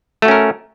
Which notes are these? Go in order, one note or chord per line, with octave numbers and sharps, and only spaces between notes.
A3 C#4 F#4 A#4